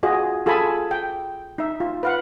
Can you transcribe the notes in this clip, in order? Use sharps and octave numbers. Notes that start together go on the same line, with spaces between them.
F4 F#4 G#4 D#5
F4 G#4 A4 G#5 A5 B5
G5
D#4 E5
F4
B4 F5 F#5